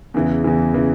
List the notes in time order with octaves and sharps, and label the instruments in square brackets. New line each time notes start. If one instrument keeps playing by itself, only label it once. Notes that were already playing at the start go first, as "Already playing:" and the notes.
[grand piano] E2 C#3 E3
E2 C#3 E3
C#3 E3